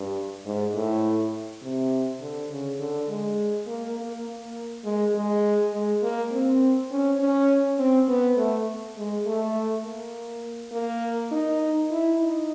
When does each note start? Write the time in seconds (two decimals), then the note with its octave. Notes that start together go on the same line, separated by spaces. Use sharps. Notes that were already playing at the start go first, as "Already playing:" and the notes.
Already playing: G2
0.45 G#2
0.74 A2
1.62 C3
2.20 D3
2.50 C#3
2.79 D3
3.09 G#3
3.67 A#3
3.97 A#3
4.26 A#3
4.84 G#3
5.15 G#3
5.74 G#3
6.02 A#3
6.32 C4
6.91 C#4
7.20 C#4
7.79 C4
8.08 B3
8.37 A3
8.97 G#3
9.26 A3
9.84 A#3
10.72 A#3
11.31 D#4
11.90 E4
12.19 D#4